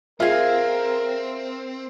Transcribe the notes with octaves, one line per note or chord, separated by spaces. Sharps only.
C4 F4 G#4 A#4 E5 F5